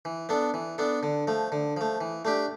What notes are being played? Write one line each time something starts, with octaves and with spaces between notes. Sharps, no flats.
E3
B3 D4 A4
E3
B3 D4 A4
D3
F3 A3
D3
F3 A3
E3
A3 D4 G4